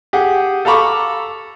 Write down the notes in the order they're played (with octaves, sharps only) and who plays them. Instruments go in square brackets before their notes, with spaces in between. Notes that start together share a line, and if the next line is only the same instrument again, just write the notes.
[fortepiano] G4 G#4 F#5
A4 F5 A#5 B5 C#6 D6